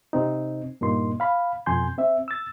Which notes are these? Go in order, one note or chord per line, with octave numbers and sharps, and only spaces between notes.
C3 C4 D#4
G2 A#2 A#3 D#4 C6
F5 B5
F2 B2 G#5 C6 G6
C4 E5
E6 A6